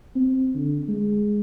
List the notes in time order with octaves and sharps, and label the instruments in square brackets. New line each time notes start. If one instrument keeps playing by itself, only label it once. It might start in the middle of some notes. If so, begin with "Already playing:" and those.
[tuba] C4
D3
G#3